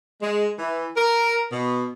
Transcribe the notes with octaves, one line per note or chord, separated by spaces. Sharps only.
G#3
E3
A#4
B2